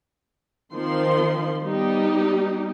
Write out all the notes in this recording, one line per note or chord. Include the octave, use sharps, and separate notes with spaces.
D#3 F3 C4 C6
G3 B3 D#4 G4